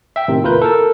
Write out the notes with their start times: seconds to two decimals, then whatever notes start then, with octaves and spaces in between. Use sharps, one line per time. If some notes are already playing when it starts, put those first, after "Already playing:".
0.16 E5 G5
0.28 A2 C3 D#3
0.43 D#2 E4 F4 A#4 B4 G6
0.62 A4 A#4 A5